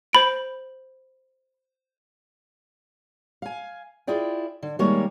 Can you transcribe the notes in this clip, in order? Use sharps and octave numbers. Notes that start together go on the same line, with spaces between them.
C5 B5 D7
F5 G#5
E4 F4 G#4 D5 G5
D3
D#3 G3 G#3 A#3 C#5